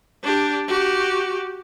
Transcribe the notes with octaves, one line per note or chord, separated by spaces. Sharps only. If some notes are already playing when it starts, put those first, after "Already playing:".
D4 G4
F#4 G4